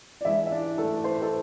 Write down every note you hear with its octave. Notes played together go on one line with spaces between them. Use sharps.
D5
E3 G#3 D4 E4 E5
E5
D4 D5
A3 A4
C5
B4
A4